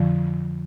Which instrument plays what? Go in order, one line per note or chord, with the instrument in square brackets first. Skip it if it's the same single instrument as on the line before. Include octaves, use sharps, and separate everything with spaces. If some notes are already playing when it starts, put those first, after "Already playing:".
Already playing: [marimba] F2 D3 F3